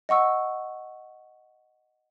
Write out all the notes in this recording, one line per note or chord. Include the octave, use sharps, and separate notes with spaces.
D#5 F#5 C#6 E6